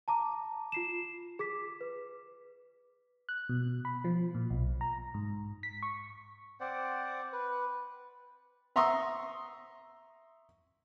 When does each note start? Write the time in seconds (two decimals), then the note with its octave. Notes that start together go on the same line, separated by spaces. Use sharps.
0.08 A5 A#5 D6
0.72 F4 C7 E7
1.39 G#4 D6 B6
1.81 B4
3.29 F#6
3.49 B2
3.85 B5
4.04 F3
4.35 A#2
4.50 B1
4.81 A#5
5.14 G#2
5.63 B6
5.83 C#6
6.60 C4 C5 D5 F#5
7.32 B4
8.76 E5 A#5 C6 C#6 D#6 E6